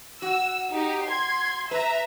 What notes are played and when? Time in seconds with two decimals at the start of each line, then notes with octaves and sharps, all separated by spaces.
0.22 F#4 E6
0.72 D#4 G4
1.06 C6 G#6
1.71 B4 E5 A#5